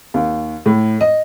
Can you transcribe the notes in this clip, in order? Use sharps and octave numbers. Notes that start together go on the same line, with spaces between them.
D#2
A2
D#5